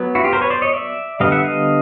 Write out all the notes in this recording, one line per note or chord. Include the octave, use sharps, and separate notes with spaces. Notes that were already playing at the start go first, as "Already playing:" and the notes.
Already playing: F#3 B3
E4 F#4
F4 G4
A#4 C5
B4 C#5
C5 D5
C#5 D#5
D5 E5
D3 G3 B3 D#5 F5
E5 F#5
D#5 F5